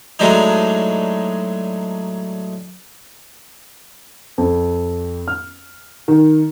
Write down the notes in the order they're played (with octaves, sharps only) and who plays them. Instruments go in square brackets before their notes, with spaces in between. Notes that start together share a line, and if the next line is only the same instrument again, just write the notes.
[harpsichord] A2 F#3 G#3 D4 D#4
[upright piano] F2
F6
D#3